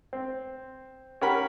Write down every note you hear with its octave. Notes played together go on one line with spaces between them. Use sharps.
C4
C#4 G4 A#4 F#5 B5